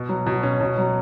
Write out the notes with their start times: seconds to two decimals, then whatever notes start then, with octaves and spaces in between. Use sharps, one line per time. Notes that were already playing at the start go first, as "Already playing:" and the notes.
Already playing: B2
0.09 F#3
0.26 B2
0.43 C#4
0.61 B2
0.78 F#3